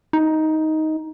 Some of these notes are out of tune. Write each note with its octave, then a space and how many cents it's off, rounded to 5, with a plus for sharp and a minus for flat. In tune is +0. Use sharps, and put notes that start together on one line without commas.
D#4 +10